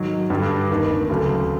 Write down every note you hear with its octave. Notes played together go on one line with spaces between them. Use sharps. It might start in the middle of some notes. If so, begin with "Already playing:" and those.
Already playing: G#2 D#3 F#3
G2 D3 G3
F1 D#2 D#3
D2 C#3 F#3 A3